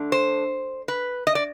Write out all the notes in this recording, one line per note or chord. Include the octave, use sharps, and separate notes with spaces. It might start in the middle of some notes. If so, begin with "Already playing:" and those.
Already playing: D3 A3 D4
C5
B4
D#5
D5